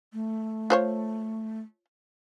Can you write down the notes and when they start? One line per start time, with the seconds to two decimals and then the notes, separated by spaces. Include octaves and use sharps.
0.13 A3
0.70 F4 C5 C#5